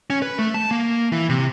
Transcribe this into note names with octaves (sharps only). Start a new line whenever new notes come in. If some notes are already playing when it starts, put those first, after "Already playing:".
C#4
B4
A3
A5
A#3
E3
C3